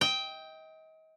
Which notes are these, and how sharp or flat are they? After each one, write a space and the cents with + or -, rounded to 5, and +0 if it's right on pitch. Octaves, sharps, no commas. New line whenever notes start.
D#5 +35 G5 +0